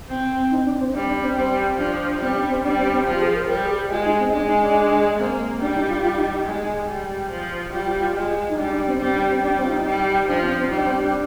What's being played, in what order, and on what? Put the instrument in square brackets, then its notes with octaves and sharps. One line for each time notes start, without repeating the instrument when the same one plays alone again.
[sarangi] C4
[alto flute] D#4
D4
C4
[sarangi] G3 [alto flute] D4
[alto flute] D4
C4
[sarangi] G3 [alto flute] C4
[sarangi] F3 [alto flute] D4
[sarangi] G3 [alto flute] C4
[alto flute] D4
C4
[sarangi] G3 [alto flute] D4
[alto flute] C4
C4
[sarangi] F3 [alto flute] G4
[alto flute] G#4
A#4
C5
[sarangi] G3 [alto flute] A#4
[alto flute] G#4
G4
[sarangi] G#3 [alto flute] F4
[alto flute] D#4
C4
[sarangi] G#3 [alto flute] D4
[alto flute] D#4
D4
[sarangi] A#3 [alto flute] C4
[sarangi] G3 [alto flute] D4
[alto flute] D#4
F4
F4
D#4
D#4
[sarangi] G#3
G3
F3
[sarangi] G3 [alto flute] F4
[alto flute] F4
F4
[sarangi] G#3
[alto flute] D#4
[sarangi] G3 [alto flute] D4
[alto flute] D4
C4
[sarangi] G3 [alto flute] C4
[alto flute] D4
C4
[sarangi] G3 [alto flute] D4
[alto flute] C4
F4
D#4
[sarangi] G3
[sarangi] F3 [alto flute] D4
[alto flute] C4
C4
[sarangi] G3 [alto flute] D#4
[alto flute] D4
C4
D4